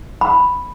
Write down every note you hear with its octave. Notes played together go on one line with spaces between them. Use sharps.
B5